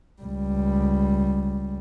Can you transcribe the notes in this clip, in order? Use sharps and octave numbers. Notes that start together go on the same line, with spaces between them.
C#2 G3